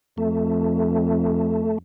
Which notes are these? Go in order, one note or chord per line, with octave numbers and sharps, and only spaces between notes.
F2 A3